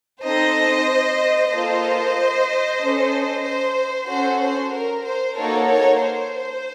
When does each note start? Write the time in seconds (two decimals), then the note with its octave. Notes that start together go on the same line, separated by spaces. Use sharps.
0.23 C4 D#4 A4 C5 D#5
1.51 A#3 F4 A4 C5 D#5
2.80 C#4 A4
3.44 C5
4.08 C#4 F#4 A4 C5
4.41 C5
4.73 A#4
5.05 C5
5.36 A#3 D#4 F#4 A4 A#4 C#5
5.69 A#4 C#5
6.00 C5